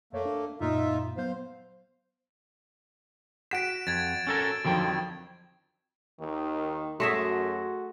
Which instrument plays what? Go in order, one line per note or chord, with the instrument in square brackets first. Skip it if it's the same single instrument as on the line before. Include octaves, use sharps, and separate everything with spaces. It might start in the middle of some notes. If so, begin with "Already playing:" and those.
[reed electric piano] F2 C#5 [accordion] A3 A#3
[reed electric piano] D4
[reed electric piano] F#2 A#2 A#3 [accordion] D#4 F4 E5
[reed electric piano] F#3 B3 G6 [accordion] C5 F5
[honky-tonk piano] F#4 B6 [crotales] D7 E7
[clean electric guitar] F2 [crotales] G#6 A6
[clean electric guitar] C#4 A4 A#4
[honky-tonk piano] F2 D#3 F#3 [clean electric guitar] D3 F3 G5
[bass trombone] D#2 [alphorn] D#3
[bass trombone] F#2 [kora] A3 G#4 E5 [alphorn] F#4 [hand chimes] C6 A#6